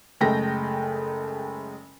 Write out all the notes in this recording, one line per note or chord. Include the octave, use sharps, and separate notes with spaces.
F#1 G#3 A3 G5 A#6